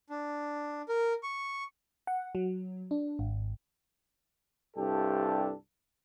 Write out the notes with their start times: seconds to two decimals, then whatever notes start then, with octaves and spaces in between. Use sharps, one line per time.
0.10 D4
0.89 A#4
1.23 C#6
2.07 F#5
2.35 F#3
2.91 D4
3.19 G#1
4.77 C2 G2 D4 G4 A4